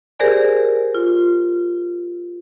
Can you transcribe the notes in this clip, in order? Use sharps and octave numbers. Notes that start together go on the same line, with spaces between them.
G4 G#4 A#4 C5 D5 G#5
F4